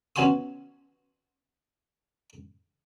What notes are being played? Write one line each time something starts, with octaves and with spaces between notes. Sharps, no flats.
B3 C#4 F#4 G#5 C6 D#6